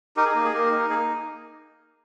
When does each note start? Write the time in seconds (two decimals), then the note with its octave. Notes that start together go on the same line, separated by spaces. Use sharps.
0.17 D#4 G4 A#4
0.25 G#4
0.35 A#3 G4
0.45 G#4
0.53 A#3 G4 A#4
0.71 D#4
0.90 A#3 G#4